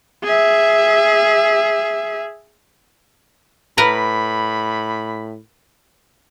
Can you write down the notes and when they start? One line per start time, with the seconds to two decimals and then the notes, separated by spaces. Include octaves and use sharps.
0.24 G#4 E5
3.78 A2 A#4 B4 A#5 B5